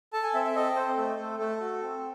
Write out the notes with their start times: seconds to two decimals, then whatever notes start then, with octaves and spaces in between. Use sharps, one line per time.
0.13 A4 A5
0.23 G#5
0.34 C4 E5
0.45 E5
0.56 A4 D#5
0.76 C4 C5
0.97 A3 A4
1.18 A3
1.39 A3 A4
1.60 F#4
1.81 C4